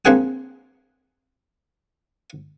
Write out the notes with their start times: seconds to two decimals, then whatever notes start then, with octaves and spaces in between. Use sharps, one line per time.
0.05 A#1 A#3 C4 G#4 F#5 D#6